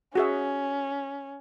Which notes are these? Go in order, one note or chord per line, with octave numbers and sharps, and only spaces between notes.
C#4 F#4 G#4 E5